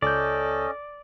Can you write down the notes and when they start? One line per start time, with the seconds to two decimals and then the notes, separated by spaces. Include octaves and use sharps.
0.02 C#2 C#4 A4 D5 D#5 G6